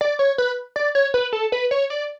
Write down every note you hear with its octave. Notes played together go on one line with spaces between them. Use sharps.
D5
C#5
B4
D5
C#5
B4
A4
B4
C#5
D5